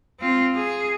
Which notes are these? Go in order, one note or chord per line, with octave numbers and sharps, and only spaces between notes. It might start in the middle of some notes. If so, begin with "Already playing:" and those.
C4 F4
G#4